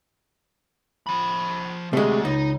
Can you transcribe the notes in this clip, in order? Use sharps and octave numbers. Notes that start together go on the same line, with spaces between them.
F3 B5
C3 G#3 A3 F#4
C#2 D#4